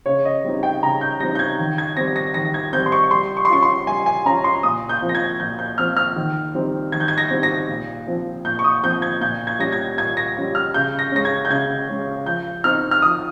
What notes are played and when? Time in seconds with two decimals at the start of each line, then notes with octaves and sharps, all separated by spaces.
0.06 C#3 C#5
0.25 D#5
0.44 G3 C4 D#4
0.63 G5
0.82 C#3 A#5
1.01 G6
1.20 G3 C4 D#4 A#6
1.35 G6
1.39 G#6
1.59 D#3
1.78 G#6
1.97 G3 C4 A#6
2.16 A#6
2.34 D#3 A#6
2.54 G#6
2.73 G3 C4 G6
2.86 C6
2.92 C#6
3.11 G3 C6
3.37 C#6
3.45 C6
3.49 C#4 F4 C#6
3.62 C6
3.87 G3 G#5
4.06 G#5
4.25 C#4 F4 A#5
4.44 C6
4.63 A#2 D#6
4.89 G6
5.02 F3 C4 F4
5.09 A#6
5.15 G#6
5.40 A#2 G6
5.59 G6
5.78 F3 C4 F4 F6
5.97 F6
6.16 D#3
6.54 G3 C4 D#4
6.92 D#3 G#6
7.00 G6
7.08 G#6
7.18 A#6
7.30 G3 C4 D#4
7.43 A#6
7.69 A#2
8.07 F3 C4 F4
8.45 A#2 G6
8.59 C#6
8.64 D#6
8.83 F3 C4 F4 G6
9.02 G#6
9.21 A#2 G6
9.47 G#6
9.59 G3 C#4 F4 A#6
9.72 G#6
9.97 A#2 G#6
10.17 A#6
10.36 G3 C#4 F4
10.55 F6
10.74 C#3 G6
10.99 A#6
11.12 G#3 C#4 A#6
11.25 G#6
11.45 G6
11.50 C#3 G#6
11.89 G#3 C#4
12.26 F3 G6
12.64 C4 D#4 F6
12.91 F6
13.02 F3 D#6